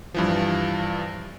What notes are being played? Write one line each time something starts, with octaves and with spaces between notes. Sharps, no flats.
G2 E3 F3